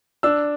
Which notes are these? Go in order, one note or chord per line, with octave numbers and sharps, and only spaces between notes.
D4 E6